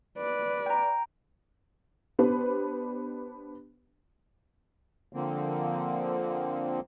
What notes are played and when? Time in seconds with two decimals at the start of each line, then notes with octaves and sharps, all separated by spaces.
0.18 B4 D5
0.66 G5 A#5
2.19 B3 D4 G4 B4 C5
5.13 D3 F3 A#3 C4